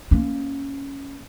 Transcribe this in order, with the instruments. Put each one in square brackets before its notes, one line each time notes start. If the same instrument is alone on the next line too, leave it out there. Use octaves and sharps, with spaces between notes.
[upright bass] A#3 C#4